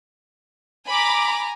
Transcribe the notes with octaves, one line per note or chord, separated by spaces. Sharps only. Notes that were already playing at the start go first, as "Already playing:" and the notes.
G#5 A#5 B5 D6